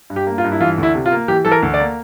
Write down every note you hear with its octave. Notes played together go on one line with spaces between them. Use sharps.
G2
G4
A#3
F4
G2
E4
E3 F4
D2
E4
C3
F4
A#3
E3 G4
E3 A4
A#4
D2
D5
A#3